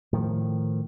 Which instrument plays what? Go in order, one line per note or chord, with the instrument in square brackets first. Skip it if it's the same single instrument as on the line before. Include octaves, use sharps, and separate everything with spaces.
[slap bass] A2 D#3 F3